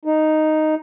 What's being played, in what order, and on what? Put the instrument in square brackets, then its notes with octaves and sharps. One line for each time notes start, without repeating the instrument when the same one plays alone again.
[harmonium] D#4